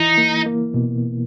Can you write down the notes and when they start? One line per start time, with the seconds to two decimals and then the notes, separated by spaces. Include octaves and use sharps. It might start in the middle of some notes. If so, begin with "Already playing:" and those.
Already playing: E3 D#4 E4
0.18 A#3
0.46 A#3
0.74 B2 B3